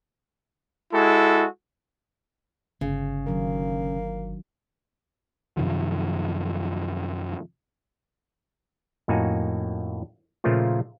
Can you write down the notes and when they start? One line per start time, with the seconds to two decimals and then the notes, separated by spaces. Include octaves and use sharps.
0.92 G#3 E4 F#4 A4
2.81 G1 C#3
3.26 D#3 F#3 A#3 D4
5.57 F#2 C3 D#3 F3
9.08 F2 A2 A#3 D#4 F#4 G#5
10.44 A#2 C#3 F3 A3 A#3 F4